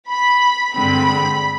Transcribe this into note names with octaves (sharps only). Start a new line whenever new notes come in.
B5
G2 D3 G#3 C4 B5